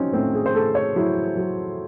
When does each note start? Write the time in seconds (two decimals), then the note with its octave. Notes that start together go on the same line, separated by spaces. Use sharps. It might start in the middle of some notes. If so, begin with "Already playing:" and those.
Already playing: F#3 C4 C#4 D#4
0.13 A2 C4
0.35 G#4
0.46 C5
0.55 A2 A4
0.75 C#5
0.96 F#3 E4
1.37 F#3